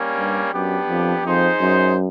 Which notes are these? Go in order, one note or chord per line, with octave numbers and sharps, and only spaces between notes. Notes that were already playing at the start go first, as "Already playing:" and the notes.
Already playing: G3 A#3 C#4
G2
F#2 B3 D4 G4
F2
F2 D#4 G#4 C5
F#2